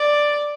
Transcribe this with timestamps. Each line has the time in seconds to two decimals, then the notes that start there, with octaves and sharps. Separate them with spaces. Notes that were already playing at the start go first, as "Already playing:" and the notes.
Already playing: D5